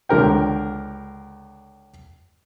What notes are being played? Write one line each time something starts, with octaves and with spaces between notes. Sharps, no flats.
C#2 D3 A#4 G5